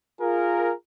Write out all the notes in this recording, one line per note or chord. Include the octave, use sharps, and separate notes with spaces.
F4 G#4 A#4